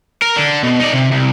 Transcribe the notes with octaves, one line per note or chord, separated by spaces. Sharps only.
A#4
D3
B2
D#4 D5
C3
C2